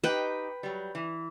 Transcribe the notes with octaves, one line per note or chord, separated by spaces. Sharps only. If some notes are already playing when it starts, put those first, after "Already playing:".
D#4 G4 B4 G5
F#3 G3
E3